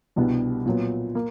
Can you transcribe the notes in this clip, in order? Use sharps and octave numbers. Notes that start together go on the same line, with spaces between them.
C2 B2 G3 B3 D4
A#2 F#3 B3
A#3